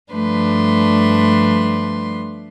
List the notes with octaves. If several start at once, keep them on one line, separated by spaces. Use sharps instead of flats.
G2 F3 A3 D4 B4 C6